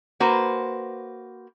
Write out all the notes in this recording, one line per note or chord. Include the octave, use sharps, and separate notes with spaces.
A#3 F#4 B4 C5